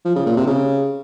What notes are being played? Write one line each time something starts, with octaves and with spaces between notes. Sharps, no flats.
F3
C#3
A#2
C3
C#3